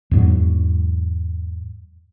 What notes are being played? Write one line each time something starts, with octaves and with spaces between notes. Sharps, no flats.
E2 G#2 F#3